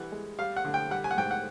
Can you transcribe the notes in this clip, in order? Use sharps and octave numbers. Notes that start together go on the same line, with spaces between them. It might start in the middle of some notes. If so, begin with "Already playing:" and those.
Already playing: E3 G3 F#5
G#3
G3 F5
F#5
D3
G5
G3 F#5
G#5
F#5
G#2 G5
F#5